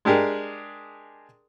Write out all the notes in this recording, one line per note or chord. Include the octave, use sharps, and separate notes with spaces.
G#3 D4 G4 G#4 A#4